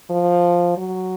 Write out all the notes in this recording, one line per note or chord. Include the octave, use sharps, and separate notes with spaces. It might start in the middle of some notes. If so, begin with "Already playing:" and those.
F3
F#3